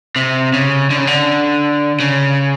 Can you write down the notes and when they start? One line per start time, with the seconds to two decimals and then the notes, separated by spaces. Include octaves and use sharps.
0.16 C3
0.53 C#3
0.90 D3
0.98 C#3
1.07 D3
2.00 C#3